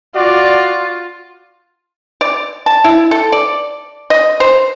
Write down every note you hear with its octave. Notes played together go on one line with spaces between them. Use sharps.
F4 F#4 D5
D5
A5
E4
A4
D5
D#5
C5